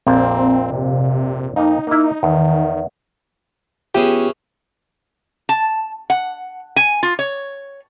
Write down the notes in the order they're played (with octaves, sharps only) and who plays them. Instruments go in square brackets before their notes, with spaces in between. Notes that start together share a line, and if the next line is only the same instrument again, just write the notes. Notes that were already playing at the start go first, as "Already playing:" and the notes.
[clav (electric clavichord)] A#1 F2 A#2 [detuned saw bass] C4
[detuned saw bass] C3
[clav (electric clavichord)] F2 A#3 [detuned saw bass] D#4
[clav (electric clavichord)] A#3 E4
[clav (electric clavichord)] E2 [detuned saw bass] D#3
[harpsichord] E3 C#4 G#4 [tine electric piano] B3 F4 [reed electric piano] G4
[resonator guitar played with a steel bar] A5
F#5
G#5
F4
C#5